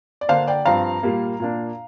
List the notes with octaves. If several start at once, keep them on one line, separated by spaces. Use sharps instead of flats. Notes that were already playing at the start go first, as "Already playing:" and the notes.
D5
D3 A#3 D4 C5 F5
D5 G5
G2 F3 C4 F5 A#5
A#2 G3 A#3
A#2 A#3 D4